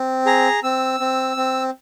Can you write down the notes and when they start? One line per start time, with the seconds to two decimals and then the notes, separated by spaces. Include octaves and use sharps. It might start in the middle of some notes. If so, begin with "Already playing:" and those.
Already playing: C4
0.26 G#4 A#5
0.63 C4 E6
1.00 C4
1.37 C4